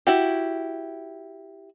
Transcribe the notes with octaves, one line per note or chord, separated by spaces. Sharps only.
E4 F#4 G4